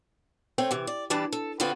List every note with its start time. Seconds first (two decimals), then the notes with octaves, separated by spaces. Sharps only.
0.58 A3 C4 C#5 G5
0.71 C3 E3
0.87 D5
1.10 E3 G3 D4 A5
1.32 A4
1.60 D3 B3 C4 F4 F#4 B4